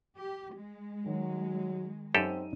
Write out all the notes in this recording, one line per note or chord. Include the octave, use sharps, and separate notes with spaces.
G4
G#3
D#3 F#3
F#2 C4 D#4 G4 A4 E6 D#7